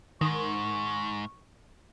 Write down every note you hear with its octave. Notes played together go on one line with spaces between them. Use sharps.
G#2 D#3 C#6